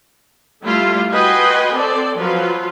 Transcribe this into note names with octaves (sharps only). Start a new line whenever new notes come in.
G3 A3 E4 F4
F#4 B4 D#5 G5 G#5 C6
C4 A4 D5
F3 F#3 F4 B4